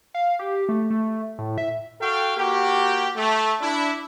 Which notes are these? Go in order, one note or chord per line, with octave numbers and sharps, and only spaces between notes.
F5
G4
A3
A3
A2
E5
F#4 A4 F5 G5
A#3 F#4 G4
A3
D4 E4